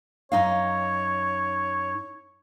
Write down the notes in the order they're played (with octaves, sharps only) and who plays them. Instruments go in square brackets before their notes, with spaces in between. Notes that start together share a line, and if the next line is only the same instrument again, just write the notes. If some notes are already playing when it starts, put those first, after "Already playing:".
[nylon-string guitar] F#2 D#4 F5 [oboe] C#5